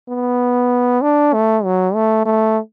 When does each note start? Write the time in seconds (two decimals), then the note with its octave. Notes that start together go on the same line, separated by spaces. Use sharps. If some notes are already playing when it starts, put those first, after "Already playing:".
0.09 B3
1.02 D4
1.33 A3
1.65 F#3
1.95 A3
2.26 A3